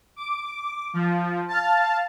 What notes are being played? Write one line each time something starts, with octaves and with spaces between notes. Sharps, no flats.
D6
F3
F5 A5